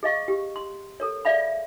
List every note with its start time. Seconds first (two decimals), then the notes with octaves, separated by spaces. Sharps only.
0.03 G#4 D#5 F5 C#6
0.28 G4
0.56 C6
1.00 A4 A#4 C#5
1.25 G#4 D5 E5 F5 B5